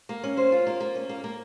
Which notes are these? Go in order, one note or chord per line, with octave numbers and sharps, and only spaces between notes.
A#3
C#4
C5
F4
A#3
A#3
C#4
A#3
A#3